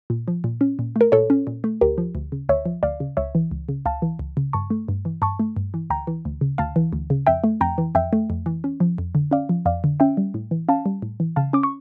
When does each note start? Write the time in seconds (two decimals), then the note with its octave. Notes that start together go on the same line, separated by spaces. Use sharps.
0.10 A#2
0.28 F3
0.44 A#2
0.61 C#4
0.79 A#2
0.96 A3 A#4
1.12 A#2 A4 C#5
1.30 C#4
1.47 A#2
1.64 A3
1.81 D2 G4 A#4
1.98 F3
2.15 D2
2.32 C#3
2.49 D2 C#5 E5
2.66 F3
2.83 D2 D5 F5
3.00 C#3
3.17 C#2 C#5 E5
3.35 E3
3.51 C#2
3.69 C#3
3.86 C#2 F5 A5
4.02 E3
4.19 C#2
4.37 C#3
4.53 G2 A5 C#6
4.70 A3
4.89 G2
5.05 E3
5.22 G2 A5 C#6
5.40 A3
5.57 G2
5.74 E3
5.90 D2 G5 A#5
6.07 E3
6.25 D2
6.41 C#3
6.58 D2 F5 A5
6.76 E3
6.93 D2
7.10 C#3
7.27 F2 E5 G5
7.44 A3
7.61 F2 G5 A#5
7.78 E3
7.95 F2 E5 G5
8.13 A3
8.30 F2
8.46 E3
8.64 C#4
8.80 F3
8.98 F2
9.15 D3
9.31 C#4 D5 F5
9.49 F3
9.66 F2 D5 F5
9.84 D3
10.00 C#4 E5 G5
10.17 G3
10.34 A2
10.51 E3
10.69 C#4 F5 A5
10.86 G3
11.02 A2
11.20 E3
11.36 C#3 F5 A5
11.53 C#4 D6
11.63 C#6